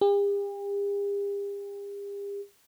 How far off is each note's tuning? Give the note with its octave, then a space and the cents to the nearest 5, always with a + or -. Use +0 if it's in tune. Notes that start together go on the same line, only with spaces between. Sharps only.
G4 +45